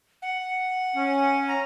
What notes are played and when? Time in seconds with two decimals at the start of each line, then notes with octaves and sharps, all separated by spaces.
0.22 F#5
0.96 C#4
1.48 A#5